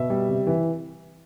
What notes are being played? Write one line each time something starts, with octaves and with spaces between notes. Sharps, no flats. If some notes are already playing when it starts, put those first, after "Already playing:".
Already playing: B2 E5
G3
C3
E3